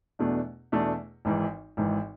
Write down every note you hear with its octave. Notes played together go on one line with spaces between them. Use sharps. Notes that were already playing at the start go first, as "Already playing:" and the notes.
E2 B2 A3 D4
E2 B2 A3 D4
G#1 G#2 E3
G#1 G#2 E3